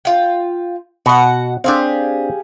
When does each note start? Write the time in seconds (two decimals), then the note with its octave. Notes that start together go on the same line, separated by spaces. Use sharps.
0.05 F4 G5
1.06 B2 F#4 F#5
1.64 C4 D4 G4 G#4 F5